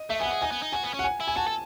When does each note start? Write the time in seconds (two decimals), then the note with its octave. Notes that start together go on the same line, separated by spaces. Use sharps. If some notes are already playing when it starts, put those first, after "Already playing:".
Already playing: D#5
0.10 A3 E5
0.19 B3 G#5
0.26 F#5
0.31 G#4
0.41 D#4 G#5
0.52 B3
0.63 D#4
0.72 F#4 G#5
0.84 B3
0.94 C#4
0.99 F#5
1.04 G#5
1.20 E4
1.28 G#5
1.36 F#4 A5
1.47 A4